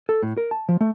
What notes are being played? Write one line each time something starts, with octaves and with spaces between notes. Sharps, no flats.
A4
A2
A#4
A5
F3
A3